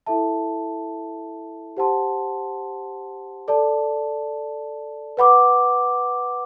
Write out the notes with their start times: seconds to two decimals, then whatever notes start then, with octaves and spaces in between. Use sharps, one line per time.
0.06 E4 A4 E5 A5
1.77 G4 C5 F#5 A5 C6
3.48 A4 D5 A5
5.17 B4 F#5 B5 D6